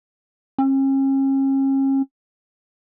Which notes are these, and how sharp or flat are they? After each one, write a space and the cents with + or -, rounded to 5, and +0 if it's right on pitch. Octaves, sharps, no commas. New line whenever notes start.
C#4 -40